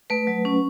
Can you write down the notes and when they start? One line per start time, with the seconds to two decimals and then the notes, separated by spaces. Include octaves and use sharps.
0.10 A3 B4
0.27 F#3
0.45 C#4